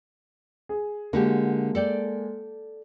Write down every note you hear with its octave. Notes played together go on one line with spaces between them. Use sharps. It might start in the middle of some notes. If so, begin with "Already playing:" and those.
G#4
D3 G#3 A#3 F#4 G4
A4 D5 G5